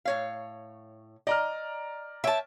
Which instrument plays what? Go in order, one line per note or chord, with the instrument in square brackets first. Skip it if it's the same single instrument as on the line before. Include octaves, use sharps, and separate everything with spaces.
[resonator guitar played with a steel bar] A2 C#5 F5
[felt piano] D5 A#5 F6 [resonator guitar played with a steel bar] D#5
[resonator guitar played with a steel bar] C#5 G5 [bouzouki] E5 A5